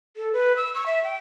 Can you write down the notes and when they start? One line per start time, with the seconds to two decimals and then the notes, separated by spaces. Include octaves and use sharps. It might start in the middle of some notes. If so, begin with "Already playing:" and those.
0.17 A4
0.33 B4
0.57 E6
0.75 C#6
0.86 E5
1.04 G5